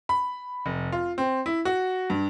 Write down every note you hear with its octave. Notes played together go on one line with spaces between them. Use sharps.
B5
F1
F4
C4
E4
F#4
G2